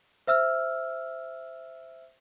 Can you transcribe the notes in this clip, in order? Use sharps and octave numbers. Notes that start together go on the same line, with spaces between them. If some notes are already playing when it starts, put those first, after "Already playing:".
C5 E5 E6 F6